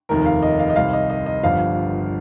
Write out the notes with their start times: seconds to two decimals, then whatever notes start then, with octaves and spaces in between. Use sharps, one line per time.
0.09 F1 D#2 D#3 A#4
0.26 F5
0.43 D#5
0.59 F5
0.70 D#5
0.76 C2 C3 D#3 F5
0.93 D#5
1.10 D#5
1.26 D#5
1.43 G1 G2 F3 F5